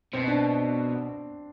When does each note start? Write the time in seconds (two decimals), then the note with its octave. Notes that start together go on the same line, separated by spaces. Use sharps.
0.13 B2 C4
0.28 D4